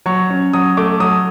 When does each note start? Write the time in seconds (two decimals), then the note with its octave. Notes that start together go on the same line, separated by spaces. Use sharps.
0.06 F#3 C#6
0.30 C#4
0.53 F#3 D#6
0.77 A3 D6
1.00 F#3 D#6